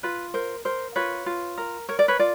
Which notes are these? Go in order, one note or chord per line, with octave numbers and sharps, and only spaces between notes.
F4 B4
A#4 C5
A#4 C5
F4 B4 C#5
F4
A#4
A#4 C#5
D5
B4 C#5
F4 D5